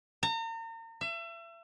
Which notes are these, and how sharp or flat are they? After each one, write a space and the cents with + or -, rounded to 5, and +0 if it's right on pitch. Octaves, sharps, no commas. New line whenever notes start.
A#5 -40
E5 +35